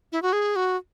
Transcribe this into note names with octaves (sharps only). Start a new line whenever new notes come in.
E4
F#4
G#4
F#4